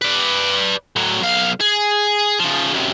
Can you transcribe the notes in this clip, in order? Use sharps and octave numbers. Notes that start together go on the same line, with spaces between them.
B4 D5
A2 F#3
B1 F5
G#4
C#3 F3
F#2 C3